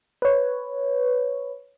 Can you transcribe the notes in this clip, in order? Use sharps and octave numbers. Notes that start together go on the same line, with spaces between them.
B4 C#5